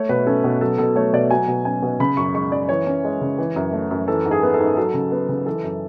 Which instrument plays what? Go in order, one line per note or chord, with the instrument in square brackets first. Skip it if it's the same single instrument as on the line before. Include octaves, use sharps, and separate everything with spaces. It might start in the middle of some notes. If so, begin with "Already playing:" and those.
Already playing: [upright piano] A3 C#5
B2 B4
C#4 A4
B2
F#3 A4
B2 A4
A3 C#5
B2 D5
F#3 G#5
B2
C#4 G#5
B2
C#3 B5
F#2 C#6
G#3 C#6
F#2 D5
E3 C#5
C#4
G#3
C#3
E3
F#2
A3
F#2
E3 A4
G#2
G#4
B3
A4
G#2
F#3 A4
C#3
B3
C#3
E3 A4
F#2